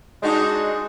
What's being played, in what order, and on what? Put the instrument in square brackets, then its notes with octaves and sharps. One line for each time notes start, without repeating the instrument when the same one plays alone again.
[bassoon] G#3 [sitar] D4 D#4 F#4